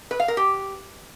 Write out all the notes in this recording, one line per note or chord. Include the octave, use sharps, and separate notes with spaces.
B4
F5
A#4
G4